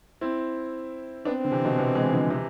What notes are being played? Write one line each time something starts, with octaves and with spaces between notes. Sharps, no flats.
C4 E4
B3 C4 D4
D3
C3 E3
B2 D3
C3 E3
E3 G#3
D3 F3
C3 E3